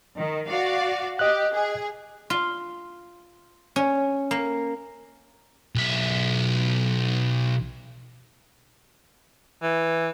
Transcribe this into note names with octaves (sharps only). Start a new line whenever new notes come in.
D#3
F#4 D5 F5
G4 D#5 F#6
G#4
F4
C#4
A#3
B1 E5
E3